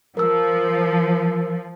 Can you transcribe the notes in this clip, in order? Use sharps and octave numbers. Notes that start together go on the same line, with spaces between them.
F3 A#4 E6